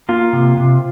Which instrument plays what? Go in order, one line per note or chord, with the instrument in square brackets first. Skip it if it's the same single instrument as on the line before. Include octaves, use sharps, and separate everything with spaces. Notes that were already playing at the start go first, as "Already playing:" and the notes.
[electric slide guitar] A#3 F4
C3
C3